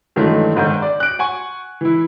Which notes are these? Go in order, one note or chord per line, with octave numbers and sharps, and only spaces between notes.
G2 D#3 E3 F#3 G#3 A3
G1 G#2 D#3 G6
D5
F#6 D7
F#5 G#5 C#6
E3 E4